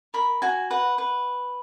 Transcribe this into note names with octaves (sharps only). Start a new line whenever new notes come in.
A#4 B5
F#4 G#5
B4 F#5
B4